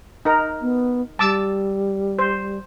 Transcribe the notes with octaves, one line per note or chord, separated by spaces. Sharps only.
D#4 A#4
B3
G3 A5 D6 E6
C5